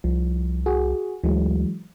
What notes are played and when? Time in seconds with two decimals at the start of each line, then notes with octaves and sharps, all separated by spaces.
0.04 C2 F3
0.66 F#4 G#4
1.23 D2 E3 F#3 G#3